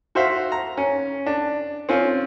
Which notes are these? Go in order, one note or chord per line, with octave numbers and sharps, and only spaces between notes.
F#4 C5 E5 F5
A#5
C#4
D4
C4 C#4 F4